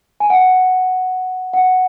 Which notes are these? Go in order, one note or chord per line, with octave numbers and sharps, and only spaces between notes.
G#5
F#5
F#5